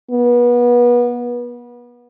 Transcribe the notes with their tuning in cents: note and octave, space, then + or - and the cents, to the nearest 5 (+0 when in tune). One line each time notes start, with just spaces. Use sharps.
B3 -30